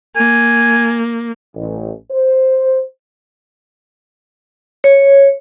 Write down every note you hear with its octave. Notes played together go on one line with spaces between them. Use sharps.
A#3 G#5
A1
C5
C#5